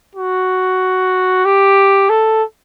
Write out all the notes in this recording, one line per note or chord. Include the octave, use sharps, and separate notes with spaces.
F#4
G4
A4